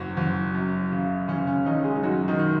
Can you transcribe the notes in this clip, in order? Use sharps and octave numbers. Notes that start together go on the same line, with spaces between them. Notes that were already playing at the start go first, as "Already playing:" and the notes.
Already playing: F#1 F#3 F#4
F#1
F#2
C#3
F#1 C#3 C#4
C#3 C#4
F#1 D#3 D#4
G#3 G#4
D#4
F#2 F#3 F#4
D#3 D#4
D#3